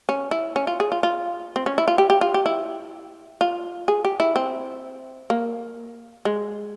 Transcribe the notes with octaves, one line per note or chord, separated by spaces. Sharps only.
C#4
E4
C#4
F4
G#4
F4
F4
C4
C#4
E4
F4
G4
G4
F4
G4
E4
F4
G#4
G4
E4
C4
A#3
G#3